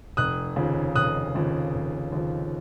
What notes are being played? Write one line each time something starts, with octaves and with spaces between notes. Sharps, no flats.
F1 D#6 F#6
D#2 C#3 F3
F1 D#6 F#6
D#2 C#3 F3
F1
D#2 C#3 F3